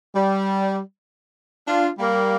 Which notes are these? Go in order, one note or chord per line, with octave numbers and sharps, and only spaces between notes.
G3
D4 F4
G3 A#3